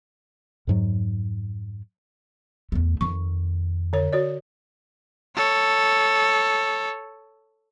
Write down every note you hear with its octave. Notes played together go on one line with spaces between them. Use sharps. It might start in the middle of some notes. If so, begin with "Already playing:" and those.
F2 G#2 F#3
E2 A3
F2 D#3 C#6
D3 C#5
F#4 C#5 D5
A4 C#5